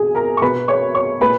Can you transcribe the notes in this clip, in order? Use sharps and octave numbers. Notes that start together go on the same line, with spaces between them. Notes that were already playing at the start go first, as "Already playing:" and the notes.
Already playing: B2 G#4 G#5
A#4 A#5
C#6
B2 B4 B5
C#5 C#6
C#5 C#6
A#2 B4 B5